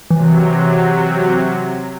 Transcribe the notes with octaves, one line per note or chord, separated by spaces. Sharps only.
C3 E3 F#3